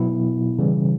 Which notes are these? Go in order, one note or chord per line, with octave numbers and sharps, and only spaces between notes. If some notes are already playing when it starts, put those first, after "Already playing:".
Already playing: B2 F#3 B3 E4
C#3 E3 G3